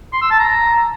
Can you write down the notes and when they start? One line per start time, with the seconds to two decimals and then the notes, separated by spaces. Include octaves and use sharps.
0.13 C6
0.22 E6
0.31 A5
0.39 A#5